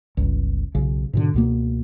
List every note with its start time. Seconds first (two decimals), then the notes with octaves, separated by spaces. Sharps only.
0.17 G1 C#2
0.75 B1 C#3
1.13 G#2 B2 D3
1.34 C#2 B2 A#3